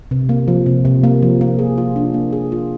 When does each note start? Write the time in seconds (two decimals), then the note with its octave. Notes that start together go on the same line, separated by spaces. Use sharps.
0.11 C3
0.29 A#3
0.48 F3
0.66 C3
0.85 C3
1.04 A#3
1.22 F3
1.41 A#3
1.59 G#4
1.78 F4
1.96 D4
2.14 A#3
2.33 G#4
2.52 F4